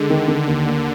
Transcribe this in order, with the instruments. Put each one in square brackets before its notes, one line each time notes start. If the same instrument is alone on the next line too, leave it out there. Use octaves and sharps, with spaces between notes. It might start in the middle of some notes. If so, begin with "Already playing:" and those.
Already playing: [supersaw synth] D3 [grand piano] G#3
[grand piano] D#3
D#3
D#2
A#3